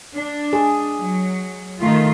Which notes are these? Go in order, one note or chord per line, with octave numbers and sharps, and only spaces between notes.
D4
G#4
F#3
D#3 A3 F4